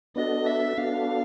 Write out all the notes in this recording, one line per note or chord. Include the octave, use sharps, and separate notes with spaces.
B3 D4 F#4 A4 D#5
E5
B3 D4 F#4 A4 F5